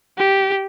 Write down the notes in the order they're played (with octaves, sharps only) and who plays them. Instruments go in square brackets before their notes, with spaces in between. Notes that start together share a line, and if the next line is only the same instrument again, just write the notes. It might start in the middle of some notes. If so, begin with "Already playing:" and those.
[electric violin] G4